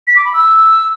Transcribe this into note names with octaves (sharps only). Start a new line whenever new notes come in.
B6
D6
B5
E6